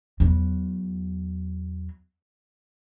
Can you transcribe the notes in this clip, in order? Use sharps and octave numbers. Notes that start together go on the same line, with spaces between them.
E2 F#3